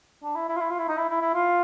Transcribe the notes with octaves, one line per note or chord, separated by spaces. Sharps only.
D4
E4
E4
F4
E4
F4
E4
D#4
E4
E4
E4
F4